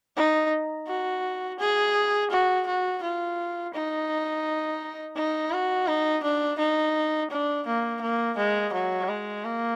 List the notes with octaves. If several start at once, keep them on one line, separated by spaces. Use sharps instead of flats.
D#4
F#4
G#4
F#4
F#4
F4
D#4
D#4
F#4
D#4
D4
D#4
D4
A#3
A#3
G#3
F#3
G#3
A#3